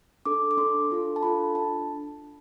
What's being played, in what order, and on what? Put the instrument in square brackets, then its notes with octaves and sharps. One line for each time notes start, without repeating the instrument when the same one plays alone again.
[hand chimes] D4 A4 D6
D6
D4 A4 C6
D4 F4 A4
A5
D4 F4 A4 B5
D4 A5